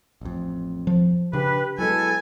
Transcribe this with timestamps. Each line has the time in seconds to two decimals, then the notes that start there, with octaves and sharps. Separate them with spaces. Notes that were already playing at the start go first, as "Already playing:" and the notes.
0.21 A1 F2
0.87 F3
1.33 C#3 D4 G4 B4
1.78 B2 F#3 G#3 E4 A4 G#5